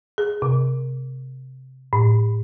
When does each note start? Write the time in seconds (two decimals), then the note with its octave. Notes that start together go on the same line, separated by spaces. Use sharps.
0.18 G#4
0.42 C3
1.93 A2